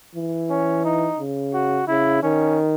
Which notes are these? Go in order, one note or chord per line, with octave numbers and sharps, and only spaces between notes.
E3
C#4
D#4
C#3
F#4
C#3 E4
D#3 C#4